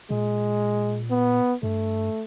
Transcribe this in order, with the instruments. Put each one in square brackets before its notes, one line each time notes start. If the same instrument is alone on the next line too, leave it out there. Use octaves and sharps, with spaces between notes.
[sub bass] A#2 [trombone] G#3
[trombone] B3
[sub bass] G2 [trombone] A3